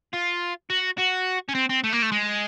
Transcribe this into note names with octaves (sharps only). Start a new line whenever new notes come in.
F4
F#4
F#4
C#4
C4
C4
A3
A#3
A3
G#3